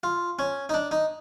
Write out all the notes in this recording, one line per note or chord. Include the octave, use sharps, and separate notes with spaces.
F4
C#4
D#4
D4
D#4